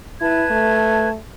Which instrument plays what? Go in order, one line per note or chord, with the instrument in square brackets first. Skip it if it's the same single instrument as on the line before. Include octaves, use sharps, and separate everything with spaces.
[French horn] E4 [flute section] B4 A5 G#6
[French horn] A3